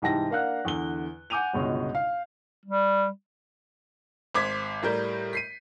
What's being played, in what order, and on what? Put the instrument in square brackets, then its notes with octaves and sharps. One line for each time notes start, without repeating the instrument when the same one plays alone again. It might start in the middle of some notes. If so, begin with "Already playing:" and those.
[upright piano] C2 G#2 E3 G4 A5 A#6
A#3 D4 F5 F#5 F#6
E2 D3 G7
F#5 G#5 D6 G6 D#7 F7
G1 C#2 B2 G#3 C#5
F5
[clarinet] G3
[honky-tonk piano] G#1 C5 D6 G#6 B6
A2 G3 A#4 G6
B6 C7 D#7